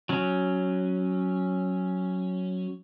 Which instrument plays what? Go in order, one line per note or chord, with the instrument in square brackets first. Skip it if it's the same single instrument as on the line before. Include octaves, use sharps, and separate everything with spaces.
[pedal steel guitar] F#3 C#4